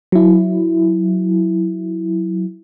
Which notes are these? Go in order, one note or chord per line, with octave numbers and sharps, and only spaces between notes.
F#3 E4